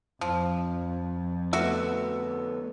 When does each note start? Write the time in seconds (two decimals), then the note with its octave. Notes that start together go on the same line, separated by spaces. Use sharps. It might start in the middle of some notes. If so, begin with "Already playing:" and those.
0.21 F2 F3
1.53 D3 A3 B3 F#4 E5